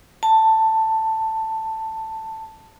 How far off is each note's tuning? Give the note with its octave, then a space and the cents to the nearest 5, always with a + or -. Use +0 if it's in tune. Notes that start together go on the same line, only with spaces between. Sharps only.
A5 +10